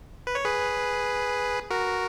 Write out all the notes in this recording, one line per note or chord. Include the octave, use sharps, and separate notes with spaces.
B4
C#5
G#4 B4
F#4 A#4